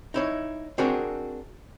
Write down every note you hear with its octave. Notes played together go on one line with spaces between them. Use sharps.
D#4 E4 C#5
C4 D4 F#4 G#4 A#4